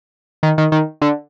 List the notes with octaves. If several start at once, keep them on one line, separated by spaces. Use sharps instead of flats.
D#3
D#3
D#3
D3